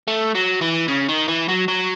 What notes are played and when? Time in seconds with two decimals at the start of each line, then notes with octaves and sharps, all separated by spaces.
0.08 A3
0.35 F#3
0.62 E3
0.88 C#3
1.09 D#3
1.28 E3
1.49 F#3
1.68 F#3